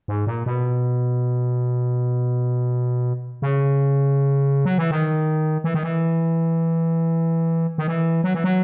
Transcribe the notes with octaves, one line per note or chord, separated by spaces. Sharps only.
G#2
A#2
B2
C#3
F#3
E3
D#3
E3
D#3
E3
D#3
E3
F#3
E3
F#3